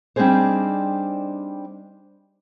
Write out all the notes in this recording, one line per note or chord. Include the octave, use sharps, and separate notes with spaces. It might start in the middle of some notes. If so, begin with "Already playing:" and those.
G3 C4 D4 D#4 G#4 C5